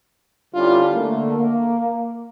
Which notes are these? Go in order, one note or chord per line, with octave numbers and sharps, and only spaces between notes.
D3 G3 C#4 D4 E4 F4
D3 A3 A#3
A#3